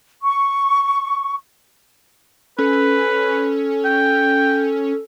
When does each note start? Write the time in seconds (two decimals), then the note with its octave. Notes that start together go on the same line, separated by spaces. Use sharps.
0.23 C#6
2.59 C#4 A4 B4
3.85 G5